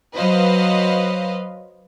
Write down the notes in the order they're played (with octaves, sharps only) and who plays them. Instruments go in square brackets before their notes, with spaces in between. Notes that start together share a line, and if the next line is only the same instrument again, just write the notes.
[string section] F#3 B4 C5 D#5 F5